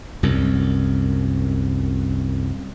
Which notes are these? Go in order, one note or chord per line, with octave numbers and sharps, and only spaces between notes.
C2 F#2